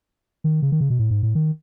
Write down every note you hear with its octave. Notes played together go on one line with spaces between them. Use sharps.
D#3
C#3
D#3
C#3
B2
A2
G#2
A2
D#3